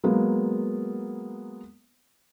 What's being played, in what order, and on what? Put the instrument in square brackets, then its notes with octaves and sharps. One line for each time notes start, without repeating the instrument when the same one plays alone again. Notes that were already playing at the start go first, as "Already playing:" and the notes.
[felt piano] F#3 G#3 A#3 B3